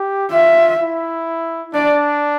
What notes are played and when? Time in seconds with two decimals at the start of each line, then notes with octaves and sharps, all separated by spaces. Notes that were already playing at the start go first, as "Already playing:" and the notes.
Already playing: G4
0.31 F4 E5
0.79 E4
1.74 D4 D5